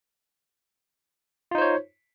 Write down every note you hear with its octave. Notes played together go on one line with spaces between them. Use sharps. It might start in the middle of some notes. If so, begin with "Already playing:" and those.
D#4 F4 C5 C#5